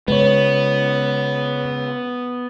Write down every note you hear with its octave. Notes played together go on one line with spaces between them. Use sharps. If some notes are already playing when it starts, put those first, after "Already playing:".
C#3 G#3 B3 B4 C#5